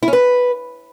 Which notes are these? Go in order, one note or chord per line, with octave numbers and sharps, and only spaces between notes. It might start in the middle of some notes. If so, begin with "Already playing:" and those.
E4
C#4
B4